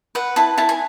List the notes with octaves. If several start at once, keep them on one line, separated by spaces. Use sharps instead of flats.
B4 F#5
E4 A5
E4 A5
G#5